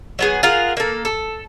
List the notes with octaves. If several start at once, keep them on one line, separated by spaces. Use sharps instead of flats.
F#3 B3 G#4
F4 G#4 A#4 F#5
A#3 A4
A4